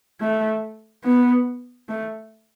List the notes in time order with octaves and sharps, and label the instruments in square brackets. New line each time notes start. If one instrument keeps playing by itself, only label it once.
[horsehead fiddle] A3
B3
A3